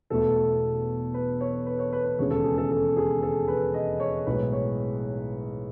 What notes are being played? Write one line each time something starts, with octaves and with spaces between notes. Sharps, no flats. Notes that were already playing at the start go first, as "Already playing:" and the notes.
E1 E2 B2 A3 A4
B4
C#5
B4
C#5
B4
B4
E1 D#2 C#3 G#3 C#5
A4
G#4
A4
A4
G#4
A4
B4
D#5
C#5
B1 A2 G#3 B4
C#5